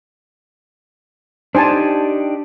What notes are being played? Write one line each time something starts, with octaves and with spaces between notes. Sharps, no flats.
D4 D#4 G4 C5 G#5 A5